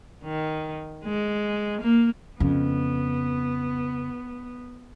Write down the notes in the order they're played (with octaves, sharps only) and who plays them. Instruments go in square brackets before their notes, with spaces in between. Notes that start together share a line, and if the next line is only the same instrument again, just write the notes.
[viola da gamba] D#3
G#3
A#3
[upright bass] F2 C#3 [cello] B3